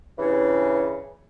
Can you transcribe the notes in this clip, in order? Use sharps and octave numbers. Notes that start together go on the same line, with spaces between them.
G2 C#3 E3